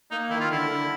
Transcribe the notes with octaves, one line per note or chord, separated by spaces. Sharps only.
A#3 D#4
D#3 E4
F4
D3 E4
D3